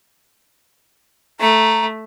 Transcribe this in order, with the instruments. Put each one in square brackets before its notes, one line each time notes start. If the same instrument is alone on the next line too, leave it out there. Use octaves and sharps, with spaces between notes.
[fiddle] A3 [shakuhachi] A#5